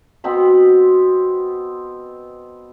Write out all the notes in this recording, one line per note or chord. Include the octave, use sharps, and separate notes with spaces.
B2 B3 C4 B5